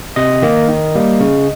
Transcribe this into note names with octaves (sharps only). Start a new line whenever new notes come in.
C3 D#5
D#3 A#3
D#3
G3 A#3
C#3